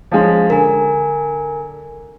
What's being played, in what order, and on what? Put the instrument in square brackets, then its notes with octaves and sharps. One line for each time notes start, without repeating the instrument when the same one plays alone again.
[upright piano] F3 G#3 C#4
[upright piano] D3 [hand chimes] A#4 G#5